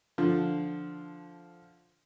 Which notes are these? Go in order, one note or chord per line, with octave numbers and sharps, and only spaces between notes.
D3 F3